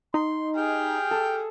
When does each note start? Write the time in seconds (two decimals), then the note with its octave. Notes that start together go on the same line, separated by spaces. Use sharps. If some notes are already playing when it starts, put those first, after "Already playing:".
0.14 D#4 C6
0.57 G4 G#4 G5 F6
1.11 A4